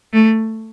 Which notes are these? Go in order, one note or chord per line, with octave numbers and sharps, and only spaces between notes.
A3